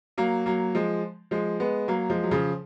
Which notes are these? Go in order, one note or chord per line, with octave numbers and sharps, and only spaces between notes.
F#3 A#3
F#3 A#3
F3 G#3
F3 G#3
G#3 B3
F#3 A#3
F3 G#3
F#3
C#3 F3